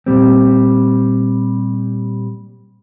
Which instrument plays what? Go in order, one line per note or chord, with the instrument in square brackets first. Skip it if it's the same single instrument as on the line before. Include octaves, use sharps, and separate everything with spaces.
[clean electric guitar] A#2 G3 C4